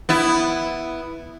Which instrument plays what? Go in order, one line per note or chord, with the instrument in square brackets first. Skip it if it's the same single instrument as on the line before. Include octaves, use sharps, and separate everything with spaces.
[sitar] B3 E4